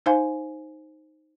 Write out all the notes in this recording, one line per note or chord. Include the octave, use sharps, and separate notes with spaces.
D#4 C5 F5 G#5